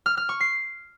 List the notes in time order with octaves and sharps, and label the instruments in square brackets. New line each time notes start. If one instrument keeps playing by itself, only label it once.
[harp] F6
F6
C#6
C7